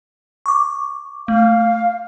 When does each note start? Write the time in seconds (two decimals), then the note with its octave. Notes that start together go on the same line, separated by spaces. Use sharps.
0.46 C#6 D6
1.28 A3 F5